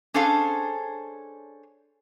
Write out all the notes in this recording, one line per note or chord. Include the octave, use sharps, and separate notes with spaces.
C#4 D4 G#4 A4 C5 F5